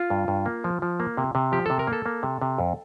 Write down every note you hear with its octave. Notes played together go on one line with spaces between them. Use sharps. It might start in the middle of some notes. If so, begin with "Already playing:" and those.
Already playing: F4
G2
G2
A#3
F3
F3
A#3
C3
C3
F3 G4
C3 A4
A#4
A#3
A4
A#3
C3
C3
F2